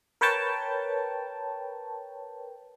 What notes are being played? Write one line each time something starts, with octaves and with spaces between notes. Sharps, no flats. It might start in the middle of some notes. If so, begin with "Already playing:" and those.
A#4 B4 C#5 G5 A5